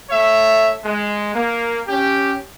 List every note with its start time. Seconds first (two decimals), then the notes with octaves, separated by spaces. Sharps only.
0.10 A3 C#5 E5
0.84 G#3
1.34 A#3
1.88 C#4 G4